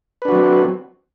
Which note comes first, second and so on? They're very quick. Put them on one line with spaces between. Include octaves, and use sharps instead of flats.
B4 D4 F#4 F#3 C4